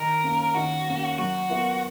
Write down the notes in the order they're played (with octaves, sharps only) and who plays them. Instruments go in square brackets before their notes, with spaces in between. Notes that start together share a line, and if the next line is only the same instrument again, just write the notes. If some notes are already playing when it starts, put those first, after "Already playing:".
Already playing: [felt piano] D#3 [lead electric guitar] A#4
[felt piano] A#3 C#4
[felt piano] D#3 [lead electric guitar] F#4
[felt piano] A#3 C#4
[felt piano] F#3 [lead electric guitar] F#4
[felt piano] B3 F4 A#4